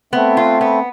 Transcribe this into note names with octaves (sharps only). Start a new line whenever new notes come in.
A3 B3 C4
F4
B3